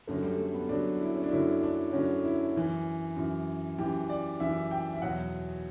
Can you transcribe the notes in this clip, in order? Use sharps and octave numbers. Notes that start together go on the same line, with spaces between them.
F#2 D3 F#3 A3
G3
A3
B3
F#2 D3 F#3 D4
E4
C#4
D4
F#2 D3 F#3 E4
D4
F#2 D3 F#3 C#4
E4
F#2 E3
F#2 E3
F#2 E3 G4
D5
F#2 E3 E5
G5
E5
E2 B2 F#3 F#5